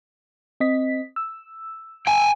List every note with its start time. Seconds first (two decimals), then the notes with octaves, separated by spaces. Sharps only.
0.60 C4 D#5 B6
1.16 E6
2.07 G5 G#5